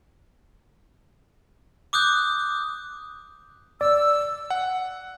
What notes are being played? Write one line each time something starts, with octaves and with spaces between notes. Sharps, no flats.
D6 D#6 F#6 G6
D5 E6
F#5